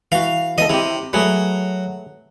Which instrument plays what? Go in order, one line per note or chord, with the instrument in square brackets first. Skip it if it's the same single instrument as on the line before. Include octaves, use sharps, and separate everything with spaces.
[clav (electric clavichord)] E3 F#4 [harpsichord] F5
[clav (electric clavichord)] E3 B3 A4 [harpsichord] D#5
[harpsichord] C3 [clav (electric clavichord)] E4 G4
[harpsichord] F#3 [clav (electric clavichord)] A3 G#4 B4